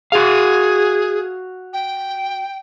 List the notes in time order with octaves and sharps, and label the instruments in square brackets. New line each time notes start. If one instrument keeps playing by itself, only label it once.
[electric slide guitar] F#4 F5 [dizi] G#4
[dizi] G5